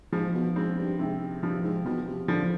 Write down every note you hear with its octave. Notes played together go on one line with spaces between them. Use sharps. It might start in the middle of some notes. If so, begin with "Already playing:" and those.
G#2 F3
B2
G#2 C4
G2
G#2 C3
G2 F3
G#2
B2 F3
C3
D3 F3